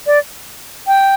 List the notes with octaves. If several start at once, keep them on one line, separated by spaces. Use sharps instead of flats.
D5
G5